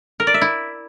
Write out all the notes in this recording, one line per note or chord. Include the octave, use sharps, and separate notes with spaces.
A#4
D5
E5
E4